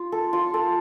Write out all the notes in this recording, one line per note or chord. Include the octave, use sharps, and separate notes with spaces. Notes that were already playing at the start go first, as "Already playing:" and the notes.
Already playing: F4
A4
F4
A4